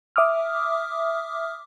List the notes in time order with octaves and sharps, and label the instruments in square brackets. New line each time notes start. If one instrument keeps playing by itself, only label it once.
[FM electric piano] E5 D6 D#6 F6